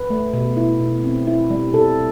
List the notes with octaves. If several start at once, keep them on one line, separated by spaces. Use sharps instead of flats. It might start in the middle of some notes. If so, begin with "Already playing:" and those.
Already playing: B4
A3
B2
E4
B2
C4
E4
G3
C3 A4